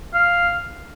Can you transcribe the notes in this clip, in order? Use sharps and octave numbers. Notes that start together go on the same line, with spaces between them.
F5